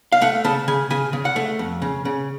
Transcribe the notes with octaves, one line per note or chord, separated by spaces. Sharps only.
F5
A3 F#5
C#3 A5
C#3 G#5
C#3 G#5
C#3
F#5
A3
F2
C#3
C#3